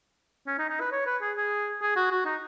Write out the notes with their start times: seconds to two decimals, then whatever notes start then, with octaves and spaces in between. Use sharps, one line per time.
0.47 C#4
0.59 D#4
0.69 D#4
0.80 B4
0.92 C#5
1.06 B4
1.21 G#4
1.37 G#4
1.82 G#4
1.96 F#4
2.11 F#4
2.25 D#4